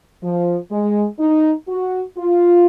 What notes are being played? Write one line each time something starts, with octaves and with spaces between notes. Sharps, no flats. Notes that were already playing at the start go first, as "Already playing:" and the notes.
F3
G#3
D#4
F#4
F4